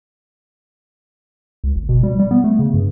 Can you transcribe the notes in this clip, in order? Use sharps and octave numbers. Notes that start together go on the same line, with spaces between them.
C#2
G1
B2
G3
G3
B3
A3
C#3
G2